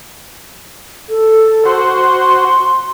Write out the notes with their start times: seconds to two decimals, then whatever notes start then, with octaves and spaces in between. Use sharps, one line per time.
1.09 A4
1.65 F#4 C5 C6